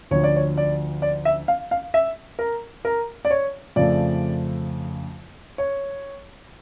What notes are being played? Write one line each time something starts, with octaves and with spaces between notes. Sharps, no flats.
D2 D3 F3 C#5
D5
C#5
D5
D5
E5
F5
F5
E5
A#4
A#4
D5
C#5
F2 C#3 F3 A3 D5
C#5